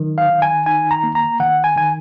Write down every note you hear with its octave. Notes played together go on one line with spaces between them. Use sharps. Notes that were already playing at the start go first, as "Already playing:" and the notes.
Already playing: D#3 F#3
F5
D#3
G#5
D#4 G#5
A#5
A#3
A#5
D#3 F#5
G#5
D#3 G#5